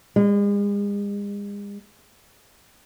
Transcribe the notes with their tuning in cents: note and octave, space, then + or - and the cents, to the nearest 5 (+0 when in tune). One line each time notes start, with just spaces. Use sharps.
G#3 -40